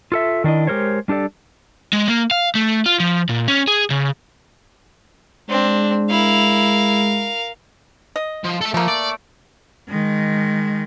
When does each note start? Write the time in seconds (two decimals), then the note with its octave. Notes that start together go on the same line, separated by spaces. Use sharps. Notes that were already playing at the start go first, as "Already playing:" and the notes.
0.12 F4 A4 E5
0.44 D#3 D4 E4 D#5
0.67 G#3 G4 A#4 C5 C#5
1.08 G3 D4 G4 A4 D5
1.93 G#3
2.08 A#3
2.31 F5
2.55 A3
2.86 F4
3.00 F3
3.29 A#2
3.48 C#4
3.67 G#4
3.90 C#3
5.49 G#3 C4 D4
6.10 E4 A#4 F5
8.16 D#5
8.44 F3
8.61 A4 E5
8.74 F3 A3 A#3
8.88 D5
9.89 D#3 G#3